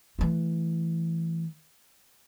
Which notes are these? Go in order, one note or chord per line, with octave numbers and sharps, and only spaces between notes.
E3 A3